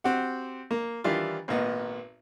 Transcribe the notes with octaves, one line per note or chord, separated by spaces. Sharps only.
C4 F#4 G4 F#5
A#3
D#3 E3 G3 D4 E4 F4
G#1 A#2 B3 D#5